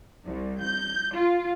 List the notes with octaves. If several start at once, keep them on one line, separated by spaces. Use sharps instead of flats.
C2
G6
F4